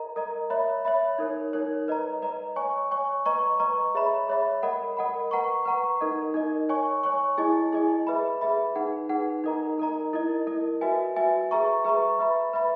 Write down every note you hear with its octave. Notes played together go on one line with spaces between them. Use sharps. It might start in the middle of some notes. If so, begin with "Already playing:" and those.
Already playing: A#4 D#5 A#5
A#4 D#5 A#5
C#5 E5 B5
C#5 E5 B5
D#4 A#4 C#5
D#4 A#4 C#5
B4 D#5 A#5
B4 D#5 A#5
C#5 G#5 C#6
C#5 G#5 C#6
B4 D#5 A#5 C#6
B4 D#5 A#5 C#6
G#4 C#5 E5 B5
G#4 C#5 E5 B5
A#4 D#5 F#5 B5
A#4 D#5 F#5 B5
B4 F#5 A#5 C#6
B4 F#5 A#5 C#6
D#4 A#4 D#5
D#4 A#4 D#5
C#5 G#5 C#6
C#5 G#5 C#6
E4 G#4 D#5 G#5
E4 G#4 D#5 G#5
G#4 B4 E5 B5
G#4 B4 E5 B5
D#4 G#4 B4 F#5
D#4 G#4 B4 F#5
D#4 A#4 D#5 A#5
D#4 A#4 D#5 A#5
E4 A#4 D#5
E4 A#4 D#5
F#4 B4 E5 G#5
F#4 B4 E5 G#5
G#4 B4 E5 A#5 C#6
G#4 B4 E5 A#5 C#6
B4 E5 B5
B4 E5 B5